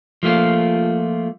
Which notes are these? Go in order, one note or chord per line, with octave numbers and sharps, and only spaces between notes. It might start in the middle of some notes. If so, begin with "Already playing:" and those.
F3 A3 A#3 F4